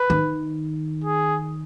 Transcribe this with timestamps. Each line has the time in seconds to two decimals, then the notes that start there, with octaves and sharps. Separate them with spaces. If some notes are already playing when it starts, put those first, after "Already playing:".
Already playing: B4
0.10 D#3
1.04 G#4